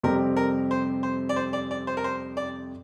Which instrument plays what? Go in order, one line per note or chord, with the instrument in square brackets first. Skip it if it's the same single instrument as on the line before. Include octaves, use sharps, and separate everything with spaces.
[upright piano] F2 C3 G3 C4 G4 [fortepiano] A#4
[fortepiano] A#4
C5
C5
D5
C5
D5
D5
C5
A#4
C5
D5